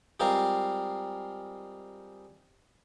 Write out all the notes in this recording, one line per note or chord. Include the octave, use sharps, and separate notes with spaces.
G3 G#3 C4 F4 A#4